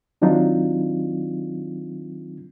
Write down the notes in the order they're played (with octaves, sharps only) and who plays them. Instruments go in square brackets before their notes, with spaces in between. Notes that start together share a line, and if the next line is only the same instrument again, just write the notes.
[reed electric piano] D#3 F#3 C4 D4 D#4 F4